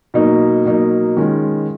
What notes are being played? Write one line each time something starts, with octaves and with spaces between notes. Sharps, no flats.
B2 F#3 A#3 D#4
B2 F#3 A#3 D#4
D#3 G#3 C#4 F4